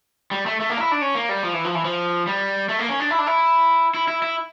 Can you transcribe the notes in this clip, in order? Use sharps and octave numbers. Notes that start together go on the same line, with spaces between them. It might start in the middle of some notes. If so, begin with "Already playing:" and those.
G3
A3
A3
A#3
D4
E4
D4
C#4
A#3
G3
F3
E3
F3
E3
F3
G3
A3
A#3
C#4
D4
E4
D4
E4
E4
E4
E4